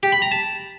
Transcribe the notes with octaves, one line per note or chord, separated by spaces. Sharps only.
G4
B5
A#5
A5